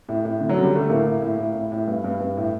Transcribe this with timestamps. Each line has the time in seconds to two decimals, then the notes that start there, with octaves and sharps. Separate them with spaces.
0.09 A2
0.25 A2
0.40 D3
0.49 F#3
0.57 D3
0.63 G3
0.73 D3 A3
0.90 A2 A#3
1.06 A2
1.22 A2
1.38 A2
1.54 A2
1.72 A2
1.88 G2
2.04 G2
2.20 G2
2.37 A2